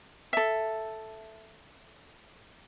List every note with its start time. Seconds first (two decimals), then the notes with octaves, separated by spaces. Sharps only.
0.33 A4 E5